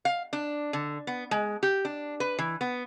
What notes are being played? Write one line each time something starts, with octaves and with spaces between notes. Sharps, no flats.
F5
D4
D3
B3
G#3
G4
D4
B4
E3
B3